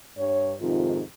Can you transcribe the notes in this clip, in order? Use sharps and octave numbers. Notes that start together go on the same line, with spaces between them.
G2 C#5
F2 G#2 C3 D#3 F4